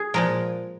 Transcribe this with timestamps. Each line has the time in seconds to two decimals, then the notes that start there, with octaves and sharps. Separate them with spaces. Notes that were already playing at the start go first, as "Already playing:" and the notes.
Already playing: G#4
0.14 A#2 F3 G#3 A#4